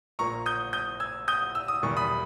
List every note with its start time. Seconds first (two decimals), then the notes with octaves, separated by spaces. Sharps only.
0.19 A#1 A#2 A#3 A#5 C#6
0.46 D#6 G6
0.73 D#6 G6
1.00 E6 G#6
1.28 D#6 G6
1.55 E6
1.68 D#6
1.83 E1 E2 D#3 G3 C#6
1.97 B5 D#6